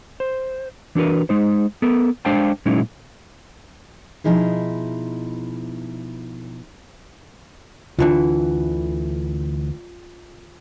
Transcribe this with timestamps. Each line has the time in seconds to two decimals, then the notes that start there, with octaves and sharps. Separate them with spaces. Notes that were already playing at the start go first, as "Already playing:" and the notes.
0.20 C5
0.95 E3 D4 F#4 A#4 B4
1.29 G#3 D#4 C5
1.82 B3 A4 A#4
2.25 G#3 D4 C5 F5 G5 A5
2.66 A#2 F#3 G#3 C#4 D#4 E4
4.24 B2 E3 F3 D#4 E4 G#4
7.99 D2 D3 E3 F4